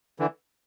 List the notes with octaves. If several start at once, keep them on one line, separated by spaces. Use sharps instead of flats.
D3 E3